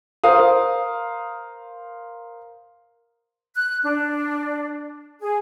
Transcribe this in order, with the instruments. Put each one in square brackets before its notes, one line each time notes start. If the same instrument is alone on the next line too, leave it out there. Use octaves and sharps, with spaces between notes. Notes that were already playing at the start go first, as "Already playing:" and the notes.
[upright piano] A#4 C5 F5 D#6
[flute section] F#6
D4
G#4